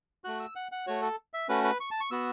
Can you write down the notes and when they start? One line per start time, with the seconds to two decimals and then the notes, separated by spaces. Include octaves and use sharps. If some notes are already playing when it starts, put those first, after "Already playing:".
0.24 A3 F#4 F#6
0.40 E6
0.56 F#5
0.72 F#5
0.87 A3 F#4 C#5
1.02 A4
1.34 E5
1.49 A3 C#4 F#4 B4
1.64 B4
1.80 C#6
1.91 A5
2.00 C#6
2.11 B3 F#4 E6